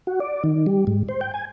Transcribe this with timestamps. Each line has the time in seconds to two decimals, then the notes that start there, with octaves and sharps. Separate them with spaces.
0.07 F#4
0.20 D5
0.44 D#3
0.66 G3
0.87 G#2
1.09 C5
1.21 G5
1.34 G#5